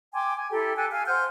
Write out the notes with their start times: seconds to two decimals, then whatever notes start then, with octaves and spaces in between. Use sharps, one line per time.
0.13 G5 G#5 C6 D6
0.37 G#5
0.51 E4 G4 A4 A#5
0.76 A4 G5 G#5 F#6
0.91 F5 G#5 F6
1.06 C5 F#5 F6 G6